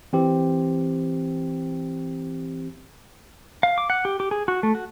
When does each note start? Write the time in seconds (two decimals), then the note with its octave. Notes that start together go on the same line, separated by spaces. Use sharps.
0.13 E3 C4 G4
3.63 F5
3.78 D6
3.90 F#5
4.05 G4
4.20 G4
4.31 G#4
4.48 F#4
4.63 A3
4.75 F#4